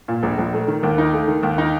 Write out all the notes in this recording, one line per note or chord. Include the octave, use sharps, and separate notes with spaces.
A#2
A#1
A#1
A3
D#3
D#2
D#4
A3
D#3
D#2
D#4